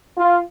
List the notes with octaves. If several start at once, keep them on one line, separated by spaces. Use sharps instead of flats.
F4